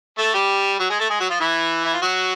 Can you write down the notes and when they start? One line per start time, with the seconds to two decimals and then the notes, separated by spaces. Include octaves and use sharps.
0.18 A3 A4
0.34 G3 G4
0.80 F#3 F#4
0.90 G#3 G#4
0.99 A3 A4
1.10 G#3 G#4
1.20 F#3 F#4
1.30 F3 F4
1.40 E3 E4
1.85 E4
1.93 F4
2.02 F#3 F#4